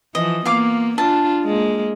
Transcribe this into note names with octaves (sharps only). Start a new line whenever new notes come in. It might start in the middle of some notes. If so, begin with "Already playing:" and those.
E3 F3 D#5
A#3 B3 F4 F5 D6
D4 F4 A5
G#3 A#3